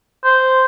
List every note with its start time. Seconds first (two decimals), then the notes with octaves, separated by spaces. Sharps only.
0.24 C5